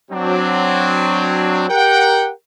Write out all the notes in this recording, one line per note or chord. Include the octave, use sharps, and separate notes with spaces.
F#3 C4 D4
G4 A#4 F#5 G5